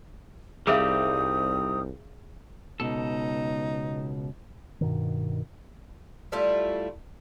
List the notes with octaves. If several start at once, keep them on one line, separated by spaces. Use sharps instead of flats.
C2 G3 C4 D#4 G#4 E5 F5 D#6
C#2 B2 D#4 A4
G2 B2 D#3
G3 A3 E4 F4